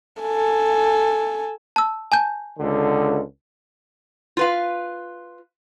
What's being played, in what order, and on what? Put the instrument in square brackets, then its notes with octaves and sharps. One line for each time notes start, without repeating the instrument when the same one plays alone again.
[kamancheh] A4 G#5
[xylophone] A5 E6
G#5 A5 G6
[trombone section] C#2 D3
[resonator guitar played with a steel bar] F4 B4 F5